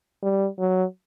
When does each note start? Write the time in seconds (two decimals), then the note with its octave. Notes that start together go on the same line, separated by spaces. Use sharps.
0.23 G3
0.59 F#3